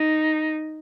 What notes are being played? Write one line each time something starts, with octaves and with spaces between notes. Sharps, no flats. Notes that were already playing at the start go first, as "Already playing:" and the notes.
Already playing: D#4